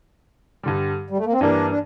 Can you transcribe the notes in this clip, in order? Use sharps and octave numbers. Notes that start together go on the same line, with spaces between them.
G2 D3 G3
G3
A3
A#3
C4
G2 E3 A#3 D4
D4